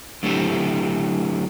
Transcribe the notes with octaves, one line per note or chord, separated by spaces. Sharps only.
D3 F#3 A3 C4 E4 G4